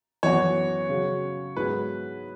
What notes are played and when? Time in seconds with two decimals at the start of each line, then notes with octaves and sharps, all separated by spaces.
0.23 F#2 E3 B3 F#4 C#5
0.89 C#3 F#3 C#4
1.56 G#2 F#3 B3 E4 G#4 B4